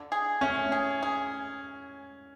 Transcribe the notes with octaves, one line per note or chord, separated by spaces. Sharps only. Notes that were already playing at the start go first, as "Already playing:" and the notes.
Already playing: D3
G#4
A3 C#4
G#4
G#4